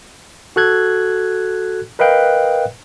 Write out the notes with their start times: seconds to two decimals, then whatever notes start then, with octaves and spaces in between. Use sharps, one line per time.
0.56 F#4 A4 F#6 G#6
1.99 A#4 B4 D#5 F5 G5 F#6